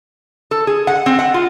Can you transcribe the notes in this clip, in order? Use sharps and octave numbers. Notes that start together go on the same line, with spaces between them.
A4
G#4
F#5
C4
F#5
F4